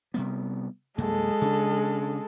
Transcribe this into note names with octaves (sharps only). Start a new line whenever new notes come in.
C3 G3 B3
C2 F#2 G#3 A#3 A4
C#3 D4